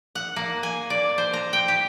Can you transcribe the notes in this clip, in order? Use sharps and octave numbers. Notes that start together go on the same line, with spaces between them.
F#5
A#3
G#5
D5
C5
A#5
G5
G4